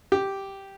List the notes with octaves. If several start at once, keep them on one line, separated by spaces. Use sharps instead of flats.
G4